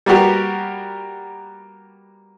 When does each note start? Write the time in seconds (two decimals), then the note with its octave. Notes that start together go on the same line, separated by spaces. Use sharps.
0.06 G3 A#3 B3 F#4 G4 A#4